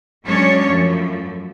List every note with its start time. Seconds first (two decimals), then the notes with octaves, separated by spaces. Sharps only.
0.24 F#3 G#3 A3 C#4 D4 C#5
0.64 F#2 F3 A3